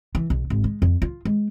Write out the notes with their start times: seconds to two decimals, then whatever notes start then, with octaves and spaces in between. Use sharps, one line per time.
0.15 E3
0.30 B1
0.50 G#1
0.64 G#3
0.82 F2
1.02 F4
1.25 G#3